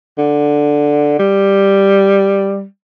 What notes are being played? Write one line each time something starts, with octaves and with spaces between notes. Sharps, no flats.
D3
G3